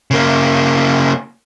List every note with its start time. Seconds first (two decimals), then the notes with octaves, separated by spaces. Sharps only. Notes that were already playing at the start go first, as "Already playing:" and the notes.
0.11 C#3 A#3